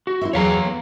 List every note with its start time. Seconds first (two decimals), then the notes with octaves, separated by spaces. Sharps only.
0.07 F#4
0.21 E4 C5 E5
0.33 E2 F#3 G#4 C#5 F5 A#5
0.65 B3